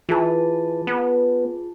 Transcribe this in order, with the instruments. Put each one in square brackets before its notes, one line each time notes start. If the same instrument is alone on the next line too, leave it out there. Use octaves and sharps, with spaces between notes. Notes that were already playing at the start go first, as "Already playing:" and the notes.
[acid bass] E3 [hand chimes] F4 G#4 A5
[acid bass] B3